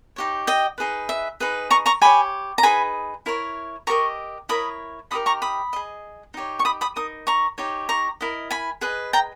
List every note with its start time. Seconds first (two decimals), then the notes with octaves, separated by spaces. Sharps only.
0.16 D#4 G4 C#5
0.47 D#5 G5
0.78 D#4 G#4 B4
1.09 E5
1.40 D#4 G#4 B4
1.70 A#5 C#6
1.86 A#5 C#6
2.01 G4 C#5 G#5 B5
2.58 A#5
2.63 D#4 G#4 B4 G#5 B5
3.26 E4 A#4 C#5
3.87 G4 A#4 D#5 A#5 C#6
4.49 E4 A#4 C#5 B5 D#6
5.11 D#4 G4 A#4 B5 D#6
5.26 A#5 C#6
5.42 B5 D#6
5.73 G#4 D#5
6.34 D#4 G4 C#5
6.59 C#6
6.65 B5 D#6
6.81 B5 D#6
6.96 D#4 A#4 D#6
7.27 A#5 C#6
7.58 D#4 G4 C#5
7.89 A#5 C#6
8.21 E4 A#4 D#5
8.51 G#5 B5
8.81 G#4 B4 D#5
9.13 G5 A#5